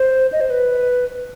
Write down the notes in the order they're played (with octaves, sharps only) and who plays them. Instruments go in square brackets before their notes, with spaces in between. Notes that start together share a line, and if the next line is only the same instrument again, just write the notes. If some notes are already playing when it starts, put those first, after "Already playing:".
Already playing: [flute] C5
D#5
C5
B4